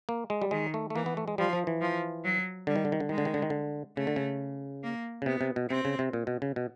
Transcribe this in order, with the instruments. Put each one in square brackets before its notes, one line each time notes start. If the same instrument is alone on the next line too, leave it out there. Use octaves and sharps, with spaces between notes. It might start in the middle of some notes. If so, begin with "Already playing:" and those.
[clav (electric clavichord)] A#3
G#3
G3
[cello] D#3 [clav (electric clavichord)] G#3
[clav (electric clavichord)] A3
A3
[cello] E3 [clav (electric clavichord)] A#3
[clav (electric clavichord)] B3
A3
G#3
[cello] F3 [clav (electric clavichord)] G3
[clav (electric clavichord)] F3
E3
[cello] F3
F#3
[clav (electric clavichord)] D3 [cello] G3
[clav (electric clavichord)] D#3
D3
D#3
D3
[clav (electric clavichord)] D#3 [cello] G#3
[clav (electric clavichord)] D3
D#3
D3
D#3
D3
[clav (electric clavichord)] C#3 [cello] A3
[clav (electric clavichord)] D3
C#3
[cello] A#3
[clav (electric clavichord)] C#3
[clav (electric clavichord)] C3 [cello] B3
[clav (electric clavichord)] C3
B2
[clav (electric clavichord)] C3 [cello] C4
[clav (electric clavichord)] C#3
C3
A#2
B2
C#3
B2